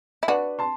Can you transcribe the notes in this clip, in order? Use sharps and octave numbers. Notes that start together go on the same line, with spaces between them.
E4
D4 F#4 B4 D5
A5 C6